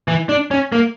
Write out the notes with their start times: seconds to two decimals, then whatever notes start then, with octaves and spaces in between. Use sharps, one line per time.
0.08 E3
0.29 D4
0.51 C#4
0.72 A#3